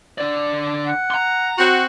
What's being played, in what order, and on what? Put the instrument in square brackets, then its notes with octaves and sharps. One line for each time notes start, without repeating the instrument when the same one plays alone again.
[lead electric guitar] D3 D5
[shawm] F#5
[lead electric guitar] A#5 C6
[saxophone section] C4 F#4